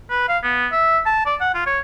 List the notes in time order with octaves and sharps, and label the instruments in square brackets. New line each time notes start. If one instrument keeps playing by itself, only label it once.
[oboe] B4
F5
B3
E5
A5
D5
F#5
F4
C#5